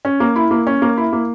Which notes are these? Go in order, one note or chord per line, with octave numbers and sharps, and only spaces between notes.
C#4
A#3
E4
A#3
C#4
A#3
E4
A#3